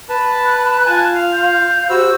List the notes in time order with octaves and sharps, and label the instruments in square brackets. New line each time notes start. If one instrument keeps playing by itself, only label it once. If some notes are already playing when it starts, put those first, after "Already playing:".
[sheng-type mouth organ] B4 A5 [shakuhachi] B5
[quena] F#6
[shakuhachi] F4 [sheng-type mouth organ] G#5 A5
[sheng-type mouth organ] F5
[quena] G6
[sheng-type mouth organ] F#4 C5 E6 [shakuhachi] G4 [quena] B5